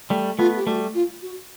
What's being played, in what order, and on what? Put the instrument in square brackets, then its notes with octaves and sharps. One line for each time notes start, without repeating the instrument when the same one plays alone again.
[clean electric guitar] G3 A3
[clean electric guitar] A3 B3 [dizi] F4
[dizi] G4
[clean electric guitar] G3 A3 [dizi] F#4
[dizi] F4
F#4